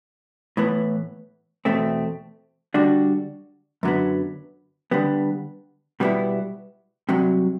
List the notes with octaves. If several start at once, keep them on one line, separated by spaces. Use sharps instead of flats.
A2 E3 B3
E2 B2 A3 C4
D3 G3 D4 F#4
F#2 D3 F#3 B3
D3 G3 B3
B2 G3 B3 E4
C2 C3 F#3